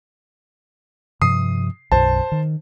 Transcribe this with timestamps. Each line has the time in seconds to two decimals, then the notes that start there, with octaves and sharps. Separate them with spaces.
1.22 G2 C3 F3 D#6 C7
1.92 B1 F#2 B2 C5 A5
2.32 D#3